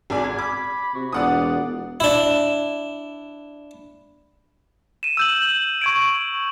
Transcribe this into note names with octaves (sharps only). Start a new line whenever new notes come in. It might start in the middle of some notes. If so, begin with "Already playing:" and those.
G#1 G#4 D5
G#6
B5 D6
C3 F#4
E1 F4 D5 F#5 D#6
D4 E4
D#7 E7
E6 G6 F#7
C#6 G#6 D7